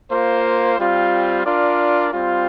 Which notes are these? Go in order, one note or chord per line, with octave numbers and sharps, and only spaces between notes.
A#3 F4 C5
G3 C4 F4
D4 F4 A#4 D5
G3 C4 F4